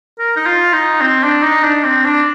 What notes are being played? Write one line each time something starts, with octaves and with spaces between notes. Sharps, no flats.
A#4
D#4
F4
D#4
C4
D4
D#4
D4
C4
D4